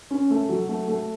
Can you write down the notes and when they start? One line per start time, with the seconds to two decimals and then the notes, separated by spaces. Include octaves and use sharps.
0.11 C#4
0.30 A3
0.49 F#3
0.69 A3
0.88 A3